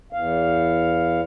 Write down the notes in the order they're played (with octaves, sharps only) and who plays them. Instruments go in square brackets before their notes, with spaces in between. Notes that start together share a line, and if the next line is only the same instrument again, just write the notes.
[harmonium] E2 F5